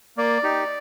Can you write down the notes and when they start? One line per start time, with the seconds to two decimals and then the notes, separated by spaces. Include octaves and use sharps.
0.17 A#3 D5
0.43 D#4 G4